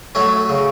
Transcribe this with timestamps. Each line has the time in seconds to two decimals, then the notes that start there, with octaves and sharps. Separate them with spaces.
0.15 F#3 A3 C#4
0.49 C#3